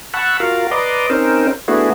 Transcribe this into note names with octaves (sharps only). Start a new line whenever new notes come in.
F#5 A5 B5 C#6 E6 F#6
F4 F#4 A#4 F5
B4 D5 D#5 A#5 C6 D6
C4 C#4 D#4 A#4 C5
A3 B3 D4 E4 F#4 G#4